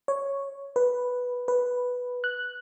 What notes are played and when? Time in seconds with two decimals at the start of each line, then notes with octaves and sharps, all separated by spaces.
0.08 C#5
0.76 B4
1.48 B4
2.24 F#6